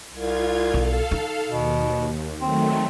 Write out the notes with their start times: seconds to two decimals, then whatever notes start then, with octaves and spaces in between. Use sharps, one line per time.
0.13 C2 F4 G#6
0.74 B1 A4 F5
1.11 D#4
1.50 D#2 B2
2.41 D#3 F#3 A3 C4